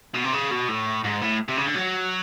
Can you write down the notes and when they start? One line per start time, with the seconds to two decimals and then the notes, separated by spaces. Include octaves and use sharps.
0.14 B2
0.24 C3
0.33 C#3
0.51 B2
0.68 A2
1.04 G#2
1.22 A2
1.48 C3
1.57 C#3
1.66 D3
1.75 F#3